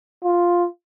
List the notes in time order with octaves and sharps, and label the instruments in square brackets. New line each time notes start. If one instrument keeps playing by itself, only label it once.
[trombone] F4